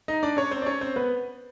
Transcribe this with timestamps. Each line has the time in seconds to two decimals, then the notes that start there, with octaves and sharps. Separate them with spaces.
0.08 D#4 D#5
0.23 D4 D5
0.37 C#4 C#5
0.51 C4 C5
0.62 D5
0.66 C#4 C#5
0.81 C4 C5
0.96 B3 B4